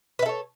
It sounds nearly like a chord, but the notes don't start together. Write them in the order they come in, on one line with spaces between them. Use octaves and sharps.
B4 E5 A4 C#5